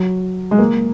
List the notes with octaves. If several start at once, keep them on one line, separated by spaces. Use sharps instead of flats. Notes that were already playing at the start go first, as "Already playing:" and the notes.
Already playing: F#3
G#3
A#3